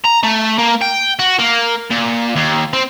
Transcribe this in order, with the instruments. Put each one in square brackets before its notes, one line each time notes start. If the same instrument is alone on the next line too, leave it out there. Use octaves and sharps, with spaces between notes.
[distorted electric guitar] A#5
A3
A#3
G5
F#4
A#3
A#2
D#2
C4